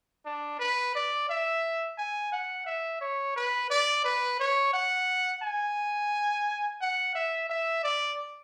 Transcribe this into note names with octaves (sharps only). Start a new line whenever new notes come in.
D4
B4
D5
E5
G#5
F#5
E5
C#5
B4
D5
B4
C#5
F#5
G#5
F#5
E5
E5
D5